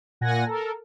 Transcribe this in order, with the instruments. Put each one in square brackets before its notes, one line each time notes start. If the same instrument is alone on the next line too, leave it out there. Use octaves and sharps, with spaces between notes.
[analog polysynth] A#2 F#5 G#5 A#6
A4 A#4